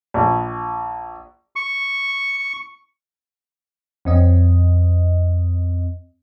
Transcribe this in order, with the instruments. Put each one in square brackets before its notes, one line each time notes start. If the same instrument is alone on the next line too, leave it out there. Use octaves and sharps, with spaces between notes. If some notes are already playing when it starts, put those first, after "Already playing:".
[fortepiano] A#1
[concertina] C#6
[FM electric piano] F2 C4 D#5